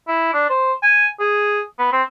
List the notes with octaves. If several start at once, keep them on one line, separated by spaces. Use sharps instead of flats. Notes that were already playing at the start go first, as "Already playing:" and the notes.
E4
D4
C5
G#5
G#4
B3
C4